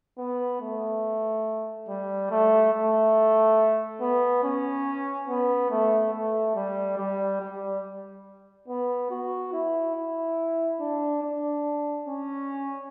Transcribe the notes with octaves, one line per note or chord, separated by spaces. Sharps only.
B3
A3
G3
A3
A3
B3
C#4
B3
A3
A3
G3
G3
G3
B3
F#4
E4
E4
D4
D4
C#4